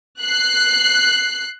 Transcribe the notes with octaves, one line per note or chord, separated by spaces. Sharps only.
F#6 C7